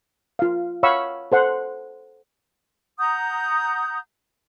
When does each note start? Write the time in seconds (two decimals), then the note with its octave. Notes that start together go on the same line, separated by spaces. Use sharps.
0.39 F4 F5
0.83 C#5 F5 F#5 B5 C#6 E6
1.32 A4 C5 F#5 C6
2.98 F#5 A#5 D#6 G6